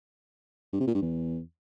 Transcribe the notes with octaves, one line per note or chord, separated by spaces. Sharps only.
G2
C3
A#2
G2
E2